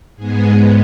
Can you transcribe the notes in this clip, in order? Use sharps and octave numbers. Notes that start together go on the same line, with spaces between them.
G#2 G#3 B3 G#4